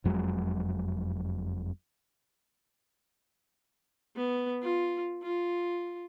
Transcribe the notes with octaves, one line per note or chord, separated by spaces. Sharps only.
F#1 F2 F#3 G#3
B3
F4
F4